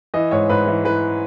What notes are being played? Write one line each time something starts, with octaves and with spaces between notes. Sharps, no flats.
E3 D#5
G#2 C#5
G#2 B4
E3
E3 B4